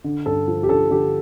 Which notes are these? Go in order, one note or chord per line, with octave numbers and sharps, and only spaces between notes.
D3
G2 A4
F3
G4
D3 A4
D3 G4